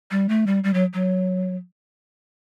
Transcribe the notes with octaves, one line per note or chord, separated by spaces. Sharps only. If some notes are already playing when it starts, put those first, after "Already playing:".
G3
A3
G3
G3
F#3
F#3